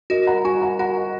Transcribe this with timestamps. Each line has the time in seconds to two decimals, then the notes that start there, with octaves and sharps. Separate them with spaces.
0.10 F#4 A#4 D#5
0.27 F#5 A#5
0.45 F#4 G#5 C#6
0.62 F#5 A#5
0.79 F#4 F#5 A#5